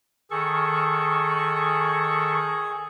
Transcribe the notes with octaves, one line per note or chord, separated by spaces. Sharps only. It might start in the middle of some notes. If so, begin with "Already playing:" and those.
D#3 G#4 A4 C#6